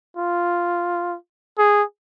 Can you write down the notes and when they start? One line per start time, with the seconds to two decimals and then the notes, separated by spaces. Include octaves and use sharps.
0.17 F4
1.58 G#4